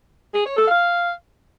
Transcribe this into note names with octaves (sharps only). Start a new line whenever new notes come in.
G#4
C#5
A4
F5